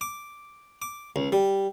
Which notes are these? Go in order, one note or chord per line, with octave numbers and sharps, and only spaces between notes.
D6
D6
C#2
G3